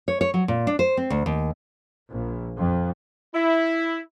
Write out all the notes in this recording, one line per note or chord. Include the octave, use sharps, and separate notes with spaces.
C#5
C#5
F#3
A#2
D4
C5
C4
D2
D#2
A#1
F2
E4